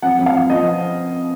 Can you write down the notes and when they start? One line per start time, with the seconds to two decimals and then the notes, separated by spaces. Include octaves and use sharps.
0.02 F2 F#5
0.19 F2
0.26 F5
0.34 F2
0.50 F3 D#5